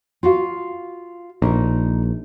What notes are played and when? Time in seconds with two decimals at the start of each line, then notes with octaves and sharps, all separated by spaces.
0.23 F4 F#4 F5
1.42 A#1 D#4 A#4